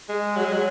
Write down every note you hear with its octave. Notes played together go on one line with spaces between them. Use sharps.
G#3
F#3
G#3
F#3